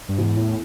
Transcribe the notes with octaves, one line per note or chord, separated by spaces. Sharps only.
G2
E2 G#2
A2 E3